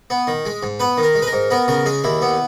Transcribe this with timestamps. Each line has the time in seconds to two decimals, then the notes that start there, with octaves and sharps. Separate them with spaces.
0.10 B3
0.27 D#3
0.46 G#3
0.63 G#2
0.80 B3 B4
0.98 D#3
1.03 A#4
1.15 G#3
1.22 B4
1.27 A#4
1.33 G#2
1.50 B3 A#4
1.68 C#3 A#4
1.86 G#3 G#4
2.04 D#2 E4
2.22 B3